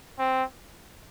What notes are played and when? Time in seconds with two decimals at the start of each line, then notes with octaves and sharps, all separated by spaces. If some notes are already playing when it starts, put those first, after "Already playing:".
0.19 C4